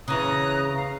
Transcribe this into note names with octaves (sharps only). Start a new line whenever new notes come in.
C#3 E3 A#5 D#6 F#6
F5